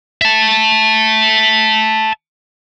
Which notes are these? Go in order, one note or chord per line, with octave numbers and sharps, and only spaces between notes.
E5 A5